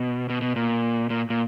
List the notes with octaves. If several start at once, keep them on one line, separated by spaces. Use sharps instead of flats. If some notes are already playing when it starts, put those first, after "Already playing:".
Already playing: B2
B2
B2
A#2
A#2
A#2